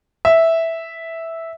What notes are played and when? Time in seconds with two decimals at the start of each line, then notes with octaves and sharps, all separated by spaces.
0.25 E5